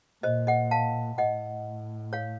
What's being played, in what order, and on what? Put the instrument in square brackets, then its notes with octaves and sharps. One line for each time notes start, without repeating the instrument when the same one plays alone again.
[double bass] A#2 [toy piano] C5 D#5
[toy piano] D#5 F#5
F5 A5
[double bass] A2 [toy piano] D#5 F#5
[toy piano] C#5 F5